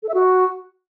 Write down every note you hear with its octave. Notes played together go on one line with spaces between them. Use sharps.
A4
E5
F#4